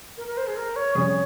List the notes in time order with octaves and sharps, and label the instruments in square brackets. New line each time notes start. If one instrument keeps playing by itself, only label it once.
[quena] A#4
A#4
C5
G#4
A#4
C#5
[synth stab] F2 C3 G3 C#4 G#4 [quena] C#5